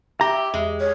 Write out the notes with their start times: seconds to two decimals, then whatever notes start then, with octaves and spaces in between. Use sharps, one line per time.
0.21 G4 E5 A#5
0.54 E2 G#3
0.80 C#5